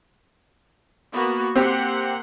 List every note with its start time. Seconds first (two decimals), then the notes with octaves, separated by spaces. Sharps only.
1.13 A#3 B3 F#4
1.56 A#3 C4 G4 F#5 C6